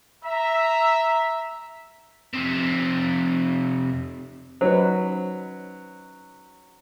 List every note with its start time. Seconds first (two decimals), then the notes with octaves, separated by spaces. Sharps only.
0.24 E5 A#5
2.34 F2 C3
4.61 F#3 C#4 D#4 B4 C5